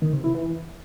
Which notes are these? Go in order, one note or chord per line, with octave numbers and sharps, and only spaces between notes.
D#3
C3
E4
E3